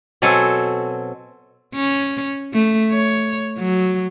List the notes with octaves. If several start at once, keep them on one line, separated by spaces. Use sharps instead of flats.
B2 F#3 C4 A4 G#5
C#4
A3
C#5
F#3